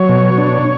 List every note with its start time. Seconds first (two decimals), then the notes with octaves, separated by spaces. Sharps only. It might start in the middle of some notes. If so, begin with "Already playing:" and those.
Already playing: F#3 C#5
0.09 B2
0.38 D4